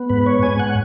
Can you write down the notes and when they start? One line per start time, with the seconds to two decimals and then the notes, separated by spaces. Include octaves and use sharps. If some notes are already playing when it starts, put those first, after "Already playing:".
Already playing: B3
0.10 G#2 B4
0.26 C#5
0.43 G#2 G#5
0.59 F#5